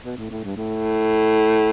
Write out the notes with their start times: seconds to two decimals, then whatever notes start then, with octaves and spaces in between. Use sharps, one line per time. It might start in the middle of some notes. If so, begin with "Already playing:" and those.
0.05 B2
0.17 A2
0.31 A2
0.44 G2
0.57 A2